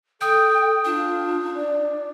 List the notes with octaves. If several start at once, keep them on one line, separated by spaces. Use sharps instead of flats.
A4 G5 D#6 G6
D4 F4
D5